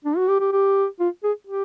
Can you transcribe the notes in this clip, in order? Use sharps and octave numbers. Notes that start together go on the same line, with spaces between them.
D4
F#4
G4
G4
G4
F4
G#4
G4